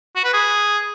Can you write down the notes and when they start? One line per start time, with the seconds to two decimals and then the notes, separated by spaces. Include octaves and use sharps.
0.16 F#4
0.24 B4
0.33 G#4